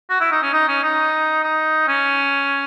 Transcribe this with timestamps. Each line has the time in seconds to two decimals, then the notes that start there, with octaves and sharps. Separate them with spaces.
0.10 F#4
0.20 E4
0.31 D#4
0.42 C#4
0.53 D#4
0.68 C#4
0.83 D#4
1.43 D#4
1.88 C#4